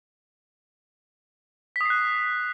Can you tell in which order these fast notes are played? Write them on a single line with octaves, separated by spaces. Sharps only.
B6 D#6 C7 F#6